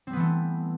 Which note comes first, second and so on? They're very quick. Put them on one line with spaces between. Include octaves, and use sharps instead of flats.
C4 G3 B3 E3 A3